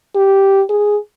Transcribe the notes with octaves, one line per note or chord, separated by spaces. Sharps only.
G4
G#4